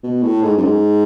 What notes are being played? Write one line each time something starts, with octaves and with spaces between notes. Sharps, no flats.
B2
A2
G#2
F#2
G#2